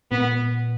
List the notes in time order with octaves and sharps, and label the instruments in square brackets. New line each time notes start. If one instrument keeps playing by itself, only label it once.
[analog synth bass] A#2 [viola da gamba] B3